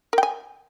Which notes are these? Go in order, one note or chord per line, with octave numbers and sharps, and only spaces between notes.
A#4 G5 G#5